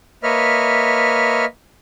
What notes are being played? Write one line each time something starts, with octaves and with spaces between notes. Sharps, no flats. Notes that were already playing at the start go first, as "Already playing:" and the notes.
A#3 B4 C#5 D#5 E5 F6